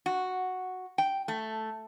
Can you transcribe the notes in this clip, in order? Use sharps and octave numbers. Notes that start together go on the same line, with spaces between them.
F#4
G5
A3